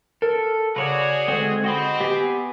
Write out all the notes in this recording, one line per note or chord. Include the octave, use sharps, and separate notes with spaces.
A4 A#4
C#3 F#4 G#4 B4 C#5 D5
D3 G#3 C4
C4 F#4 D#5 B5
B3 G4 G#5